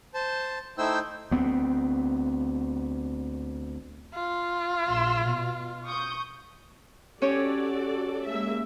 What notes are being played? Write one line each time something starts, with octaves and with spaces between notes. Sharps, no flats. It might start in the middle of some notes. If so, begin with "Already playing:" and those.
C5 A5
A3 D#4 E4 C5 G5 E6
D2 B3 C4
F4
A#1 C6 E6
B2
C#6 D#6 G6
C#4 F#4 G4 A4 C#5 D5
G#3 A#3 E5